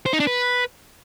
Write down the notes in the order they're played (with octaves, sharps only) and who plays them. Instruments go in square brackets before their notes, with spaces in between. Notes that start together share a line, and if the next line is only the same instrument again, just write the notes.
[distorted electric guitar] C5
D#4
D4
B4